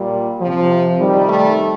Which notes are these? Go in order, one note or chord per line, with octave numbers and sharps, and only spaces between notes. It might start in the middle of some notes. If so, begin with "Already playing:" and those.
Already playing: A#2 G3
C3 F3
C3 D#3 G3
A3